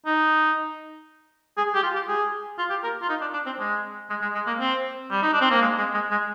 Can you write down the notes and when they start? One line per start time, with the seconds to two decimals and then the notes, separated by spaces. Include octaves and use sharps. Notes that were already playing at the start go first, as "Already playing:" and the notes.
0.06 D#4
1.57 G#4
1.75 G4
1.83 F4
1.95 G4
2.07 G#4
2.58 F4
2.70 G4
2.83 A#4
3.02 F4
3.09 D#4
3.21 D4
3.33 D4
3.46 C4
3.59 G#3
4.10 G#3
4.22 G#3
4.35 G#3
4.47 A#3
4.59 C4
5.10 G3
5.22 D#4
5.33 D4
5.41 C4
5.51 A#3
5.61 G#3
5.78 G#3
5.94 G#3
6.11 G#3